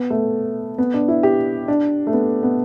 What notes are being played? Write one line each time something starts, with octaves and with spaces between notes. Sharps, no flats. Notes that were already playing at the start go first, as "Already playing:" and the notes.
Already playing: B3
A3
B3
D4
E4
G4
D4
A3
B3
B3